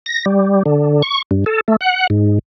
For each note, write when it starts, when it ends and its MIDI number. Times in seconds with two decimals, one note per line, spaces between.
0.06 0.25 94
0.26 0.63 55
0.66 1.02 50
1.02 1.22 85
1.31 1.44 43
1.46 1.61 69
1.68 1.76 57
1.81 2.07 78
2.10 2.39 44